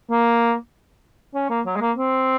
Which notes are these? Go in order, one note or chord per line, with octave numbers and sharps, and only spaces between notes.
A#3
C#4
A#3
F#3
G#3
A#3
C4